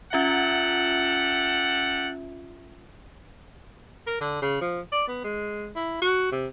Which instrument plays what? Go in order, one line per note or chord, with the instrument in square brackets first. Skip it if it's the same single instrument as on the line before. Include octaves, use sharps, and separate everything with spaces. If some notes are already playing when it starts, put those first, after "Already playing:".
[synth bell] C#4 F4 E5 [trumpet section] G4 A4 F#5
[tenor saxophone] A#4
D3
C#3
F3
D5
B3
G#3
E4
F#4
C3